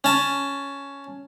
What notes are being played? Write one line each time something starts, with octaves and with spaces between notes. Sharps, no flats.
C#4 A5